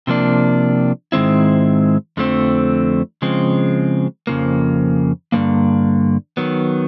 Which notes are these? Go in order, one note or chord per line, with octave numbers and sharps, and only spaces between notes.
C3 F3 A#3 D4
G#2 D#3 G#3 C4 E4
F2 D3 F3 A3 C4
C#3 F3 G#3 C4
F2 C#3 F3 A#3
G2 D3 F3 A#3
D#3 F#3 B3